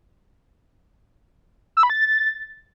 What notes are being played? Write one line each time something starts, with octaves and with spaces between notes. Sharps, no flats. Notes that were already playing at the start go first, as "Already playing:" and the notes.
E6
B5
A6